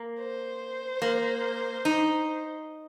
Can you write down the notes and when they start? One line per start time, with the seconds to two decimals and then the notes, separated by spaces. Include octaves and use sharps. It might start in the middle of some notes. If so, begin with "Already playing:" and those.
Already playing: A#3
0.20 C5
1.02 A#3
1.85 D#4